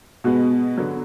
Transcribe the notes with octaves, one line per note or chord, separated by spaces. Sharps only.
B2 G#3 B3 F#4
D3 F#3 B3